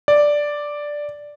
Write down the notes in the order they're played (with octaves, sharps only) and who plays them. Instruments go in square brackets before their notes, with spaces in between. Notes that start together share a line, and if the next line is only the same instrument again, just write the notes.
[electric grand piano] D5